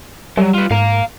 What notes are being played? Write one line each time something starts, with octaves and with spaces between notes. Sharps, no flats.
F#3 G3
F4 B4
G#2 F5 A#5